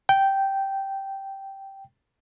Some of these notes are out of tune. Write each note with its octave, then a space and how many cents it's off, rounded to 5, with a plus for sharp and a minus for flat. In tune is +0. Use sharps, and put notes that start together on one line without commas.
G5 -10